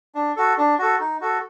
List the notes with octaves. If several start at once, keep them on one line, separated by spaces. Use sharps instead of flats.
D4
F#4 A4
D4
F#4 A4
D#4
F#4 A4